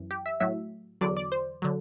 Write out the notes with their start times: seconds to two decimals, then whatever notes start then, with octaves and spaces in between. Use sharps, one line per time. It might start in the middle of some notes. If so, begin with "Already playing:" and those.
Already playing: F#2 E3
0.11 G4
0.26 E5
0.40 A2 F#3 E5
1.01 E2 D3 F#3 D5
1.17 D5
1.32 C5
1.62 D3 F#3